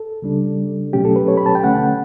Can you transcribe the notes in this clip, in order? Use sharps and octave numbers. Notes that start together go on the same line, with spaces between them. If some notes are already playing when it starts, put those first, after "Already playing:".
Already playing: A4
C#3 G3 D4
B2 F#3 A3 C#4 G4
A4
B4
C#5
B5
A5
G5
D3 A3 C#4 F#5